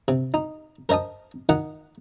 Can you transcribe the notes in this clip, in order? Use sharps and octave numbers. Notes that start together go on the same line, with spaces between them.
C3
D#4
A#4 C5 D#5 A5 D#6
D#3 D#4 F#5